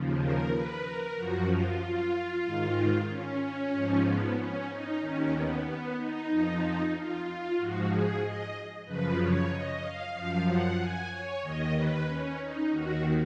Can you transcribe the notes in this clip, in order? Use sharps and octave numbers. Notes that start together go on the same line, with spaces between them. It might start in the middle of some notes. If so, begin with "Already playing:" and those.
Already playing: D#2 C#3 F3
A#4
B4
A#4
F#2 F3 F#4
F4
F4
G#2 D#3
C#4
C#4
G#2 F3
B3
C#4
D#4
D#2 D#3 C#4
B3
B3
D#4
F2 F3
F4
F4
G#2 F3 F#4
G#4
D#5
F#2 C#3 F3 B4
C#5
D#5
F5
F#2 F3 F5
F#5
G#5
C#5
D#2 D#3 D#5
B4
C#4
D#4
D#2 D#3 F#4